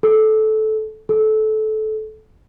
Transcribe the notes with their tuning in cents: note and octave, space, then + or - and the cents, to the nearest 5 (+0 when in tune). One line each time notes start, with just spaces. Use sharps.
A4 -15
A4 -20